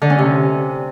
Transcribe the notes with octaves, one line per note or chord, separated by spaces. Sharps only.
D3
C#4
C3